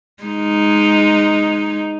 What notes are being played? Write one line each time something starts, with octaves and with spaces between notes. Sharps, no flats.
G#3 D#4